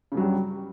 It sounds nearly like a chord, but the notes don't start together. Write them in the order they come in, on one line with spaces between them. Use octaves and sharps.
C#3 G2 F#3 G3